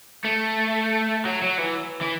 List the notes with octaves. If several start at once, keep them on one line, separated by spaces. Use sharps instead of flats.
A3
F#3
F#3
E3
E3